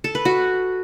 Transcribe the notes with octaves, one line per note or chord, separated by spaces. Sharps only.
A4
B4
F#4